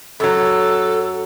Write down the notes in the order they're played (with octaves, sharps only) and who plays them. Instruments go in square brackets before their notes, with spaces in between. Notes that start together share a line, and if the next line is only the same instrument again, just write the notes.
[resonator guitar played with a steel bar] F#2 F#3 [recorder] A4